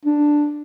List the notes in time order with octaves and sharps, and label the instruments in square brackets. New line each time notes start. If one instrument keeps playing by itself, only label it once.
[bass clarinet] D4